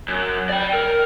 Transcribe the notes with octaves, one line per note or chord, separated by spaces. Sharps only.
F#2
D5 G5
A#4